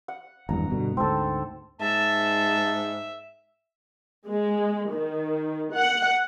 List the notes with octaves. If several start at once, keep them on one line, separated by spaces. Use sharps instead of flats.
F#5
G#1 E2 G2 A#5
G2 B2 D3
D2 G#2 C4 A4
G#2 E5 A5
G#3
D#3
F#5